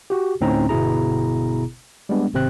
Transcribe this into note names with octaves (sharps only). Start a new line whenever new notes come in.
F#4 G4
D2 A2 C4 C#4 D#4 A#5
G1 B2 B3 E4 G#4 A#5
G3 G#3 B3 D4
G#1 C3 C4 F#6